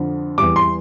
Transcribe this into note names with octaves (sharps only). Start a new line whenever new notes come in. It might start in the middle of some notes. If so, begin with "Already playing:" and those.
Already playing: F2 D3 F3
E2 E3 G3 D6
C6